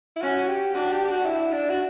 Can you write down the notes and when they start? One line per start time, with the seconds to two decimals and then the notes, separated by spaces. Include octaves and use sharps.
0.16 E4
0.22 C#4 F#4
0.48 G4
0.74 D4 F#4
0.92 G4
1.05 G4
1.09 F#4
1.26 E4
1.53 D4
1.70 F#4